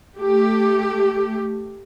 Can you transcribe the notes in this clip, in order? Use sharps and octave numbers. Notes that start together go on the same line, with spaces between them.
A3 G4